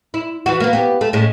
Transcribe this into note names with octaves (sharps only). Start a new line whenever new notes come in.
E4
E3 F3 F#4
A#3 B3
B3 G4
A3
A2 G#3 C#4